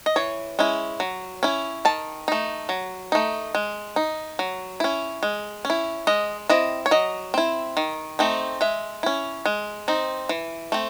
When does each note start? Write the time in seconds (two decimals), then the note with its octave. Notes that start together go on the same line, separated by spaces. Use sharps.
0.06 D#5
0.16 E3 C#5
0.59 G#3 C#4 E4
1.00 F#3
1.43 C#4 E4
1.85 D#3 A5
2.28 A3 D#4
2.69 F#3
3.12 A3 D#4
3.55 G#3
3.96 D#4
4.39 F#3
4.80 C#4 E4
5.23 G#3
5.65 C#4
5.70 E4
6.07 G#3 D#5
6.49 C4 E4 D#5
6.86 C#5
6.91 F#3 D#5
7.34 C4 E4
7.77 D#3
8.19 A3 C4 D#4
8.61 G#3 E5
9.03 C#4 E4
9.46 G#3
9.88 C4 D#4
10.29 E3
10.72 A3 C4